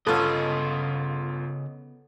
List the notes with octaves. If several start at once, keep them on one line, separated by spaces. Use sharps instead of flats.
G1 C#3 B3 C#4 F4 A4 D#5